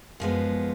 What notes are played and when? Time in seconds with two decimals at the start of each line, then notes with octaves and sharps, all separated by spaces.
0.20 F#2 F3 G#3 B3